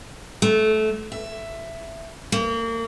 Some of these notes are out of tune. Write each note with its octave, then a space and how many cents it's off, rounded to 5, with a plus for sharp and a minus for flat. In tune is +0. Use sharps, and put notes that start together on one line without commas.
A3 -20
E5 +10
A#3 -30